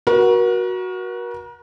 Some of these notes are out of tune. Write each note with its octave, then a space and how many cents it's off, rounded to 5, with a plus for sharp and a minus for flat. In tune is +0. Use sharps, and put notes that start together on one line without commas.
F#4 +0 A#4 +40